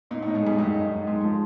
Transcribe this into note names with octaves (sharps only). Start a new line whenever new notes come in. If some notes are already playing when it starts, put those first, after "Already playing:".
A#2 D#4
A2
D#4
G#2
G2 G#4
F#2 D#4
D#4
D#4
G#2 G#3
F3